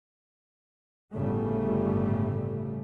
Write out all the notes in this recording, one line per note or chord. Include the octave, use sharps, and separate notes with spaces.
G1 A2 C#3 G3 A3